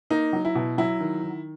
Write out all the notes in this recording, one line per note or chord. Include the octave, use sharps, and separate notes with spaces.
A#3 D#4
F#3
E4
B2
F#3 E4
D#3
D#3